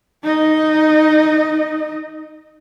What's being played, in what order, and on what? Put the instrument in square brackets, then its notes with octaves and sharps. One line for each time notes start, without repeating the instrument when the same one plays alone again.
[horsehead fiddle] D#4 D#5